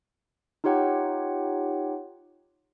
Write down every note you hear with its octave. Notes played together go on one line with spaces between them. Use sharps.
D#4 F4 G4 C#5 F#5 G5